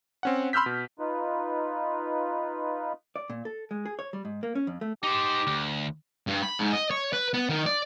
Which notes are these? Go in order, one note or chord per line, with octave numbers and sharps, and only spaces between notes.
C4 C#4 F#5
B5 C6 E6 F6 G6 B6
B2
D#4 F4 B4
D5
A#2
A4
G#3
G#4
C#5
G3
G#2
A#3
C#4
F2
A3
D#4 G4 C5
D2
G2
B5
G#2
D#5
C#5
B4
B3
D#3
D5